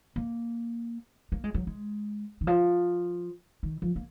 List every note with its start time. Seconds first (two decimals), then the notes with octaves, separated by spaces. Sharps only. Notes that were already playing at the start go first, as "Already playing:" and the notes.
0.16 A#3
1.32 A#3
1.44 G#3
1.54 F#3
1.67 G#3
2.41 D#3
2.47 F3
3.63 D#3
3.82 F3
3.96 A#3